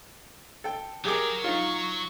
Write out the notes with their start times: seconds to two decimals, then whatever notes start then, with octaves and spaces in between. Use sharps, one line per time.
0.64 A4 G5
1.05 F#3 G4 G#4 A#4 D6
1.44 D#4 F4 C#6